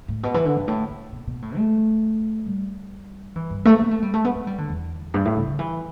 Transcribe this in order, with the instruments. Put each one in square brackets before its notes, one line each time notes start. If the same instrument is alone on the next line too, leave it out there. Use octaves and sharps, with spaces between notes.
[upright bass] A2
B2
E3
D3
G2
A2
A2
B2
B2
A2
A3
G3
E3
G2
A3
B3
A3
G3
A3
B3
A3
G3
D3
E2
G2
A2
D3
D3
E3